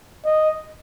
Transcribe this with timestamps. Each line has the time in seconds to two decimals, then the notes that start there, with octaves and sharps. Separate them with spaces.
0.25 D#5